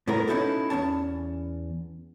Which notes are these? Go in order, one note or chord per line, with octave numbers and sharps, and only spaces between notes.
A2 A3 B3 E4 A#4
B3 C#4 D#4 E4 F#4 A4
E2 A#3 C#4 A5